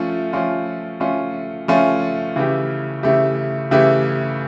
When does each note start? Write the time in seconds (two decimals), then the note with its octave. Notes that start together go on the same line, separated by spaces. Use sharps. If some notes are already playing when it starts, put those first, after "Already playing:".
Already playing: F3 A3 C#4 F4
0.33 F3 A3 C#4 F4
1.00 F3 A3 C#4 F4
1.68 F3 A3 C#4 F4
2.36 C#3 E3 A3 E4 G4
3.03 C#3 E3 A3 E4 G4
3.71 C#3 E3 A3 E4 G4